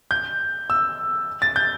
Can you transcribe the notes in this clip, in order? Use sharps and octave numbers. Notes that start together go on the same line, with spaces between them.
G6
E6
A6
G6